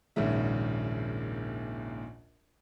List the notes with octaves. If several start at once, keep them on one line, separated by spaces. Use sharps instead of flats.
A#1 D#2 G#2 C#3 E5